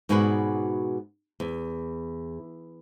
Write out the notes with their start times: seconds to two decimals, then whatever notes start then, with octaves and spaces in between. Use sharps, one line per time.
0.09 G#2 B2 F#4 G#4 B4 D5
1.40 E2